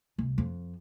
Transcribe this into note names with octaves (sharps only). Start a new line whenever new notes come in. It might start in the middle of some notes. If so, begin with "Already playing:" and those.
C2
F2